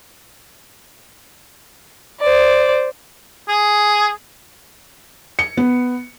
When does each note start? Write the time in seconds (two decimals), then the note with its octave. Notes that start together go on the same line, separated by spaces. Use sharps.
2.20 C5 D5
3.49 G#4
5.39 C#7
5.57 B3